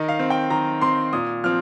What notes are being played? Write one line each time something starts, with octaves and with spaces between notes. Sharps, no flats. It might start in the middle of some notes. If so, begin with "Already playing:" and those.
Already playing: D#3 D#5
F5
C4
G5
D#3 A#5
C4 C6
A#2 D#6
F3 C4 F6